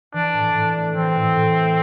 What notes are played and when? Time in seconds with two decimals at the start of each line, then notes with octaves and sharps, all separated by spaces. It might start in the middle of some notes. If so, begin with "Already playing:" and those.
0.13 E3 D4
0.34 A2
0.54 A2
0.75 A3
0.95 E3 C4
1.16 A2
1.36 A2
1.56 A3